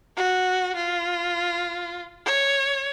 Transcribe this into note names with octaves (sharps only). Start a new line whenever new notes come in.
F#4
F4
C#5